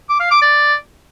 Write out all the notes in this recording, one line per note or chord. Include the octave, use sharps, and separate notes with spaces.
D6
F5
D6
D5